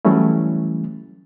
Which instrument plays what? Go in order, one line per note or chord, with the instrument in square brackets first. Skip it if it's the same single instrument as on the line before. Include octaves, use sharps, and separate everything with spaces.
[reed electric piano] E3 F#3 G3 A3 C#4 E4